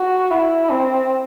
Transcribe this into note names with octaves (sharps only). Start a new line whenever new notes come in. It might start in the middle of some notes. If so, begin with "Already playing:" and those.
Already playing: F#4
E4
C4